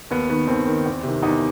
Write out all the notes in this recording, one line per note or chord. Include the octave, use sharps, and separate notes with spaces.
D#2 B3
D#3 B3
D#2 C4
D#3
E2
C3 D#3
E2 D#4